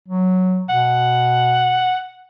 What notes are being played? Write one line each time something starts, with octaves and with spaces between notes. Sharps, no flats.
F#3
B2 F#5